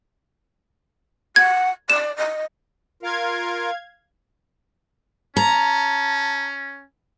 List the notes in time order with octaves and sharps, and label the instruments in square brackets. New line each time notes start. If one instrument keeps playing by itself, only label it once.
[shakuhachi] F#5 [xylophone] G#6
[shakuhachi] D5 [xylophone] E7
[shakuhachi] D#5
[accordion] F4 A#4 [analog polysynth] F5 G#6
[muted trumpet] C#4 [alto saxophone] A5 [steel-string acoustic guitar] A#5